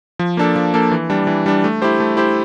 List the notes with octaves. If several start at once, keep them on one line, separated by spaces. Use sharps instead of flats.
F3
A#3 D4 A4
F3
A#3 D4 A4
E3
G3 D4
E3
G3 D4
A3
E4 G4 C5
A3
E4 G4 C5